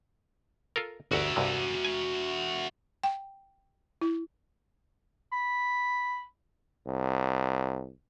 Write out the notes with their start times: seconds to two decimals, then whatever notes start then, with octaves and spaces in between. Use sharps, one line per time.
0.76 F4 A4 A#4
1.11 G1 D2 F#4 E5
1.36 C2 G2 C3
1.85 G#5
3.03 G5
4.01 E4
5.32 B5
6.87 C2